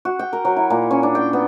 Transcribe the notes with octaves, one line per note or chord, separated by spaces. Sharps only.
F#4
G5
A#4
F#3
E4
A#2
C#4
D4
G5
B3